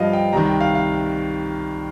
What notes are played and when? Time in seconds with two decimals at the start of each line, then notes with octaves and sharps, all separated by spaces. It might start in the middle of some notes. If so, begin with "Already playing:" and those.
Already playing: G2 F3 D#5 F5
0.13 G5
0.33 C2 C3 D#3 A#5
0.46 G5
0.60 F5
0.75 F5